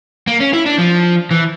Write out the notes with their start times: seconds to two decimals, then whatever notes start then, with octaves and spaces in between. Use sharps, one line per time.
0.27 A#3
0.40 C#4
0.53 E4
0.66 D4
0.79 F3
1.31 E3